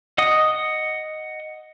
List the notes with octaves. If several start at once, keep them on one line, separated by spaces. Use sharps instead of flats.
D#5 F#5 D#6